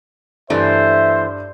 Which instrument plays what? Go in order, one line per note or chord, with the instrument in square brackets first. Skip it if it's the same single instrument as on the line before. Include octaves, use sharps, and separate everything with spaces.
[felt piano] G2 [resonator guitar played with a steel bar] E3 A3 [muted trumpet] C5 [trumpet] E5